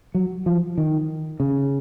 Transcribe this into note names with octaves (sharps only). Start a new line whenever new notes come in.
F#3
F3
D#3
C#3